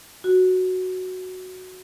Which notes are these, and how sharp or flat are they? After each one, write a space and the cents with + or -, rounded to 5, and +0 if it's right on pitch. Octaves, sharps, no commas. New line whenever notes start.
F#4 +0